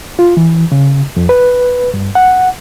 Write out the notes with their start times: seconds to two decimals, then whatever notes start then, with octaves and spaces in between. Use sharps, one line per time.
0.19 F4
0.37 E3
0.72 C#3
1.17 F2
1.29 B4
1.94 G2
2.15 F#5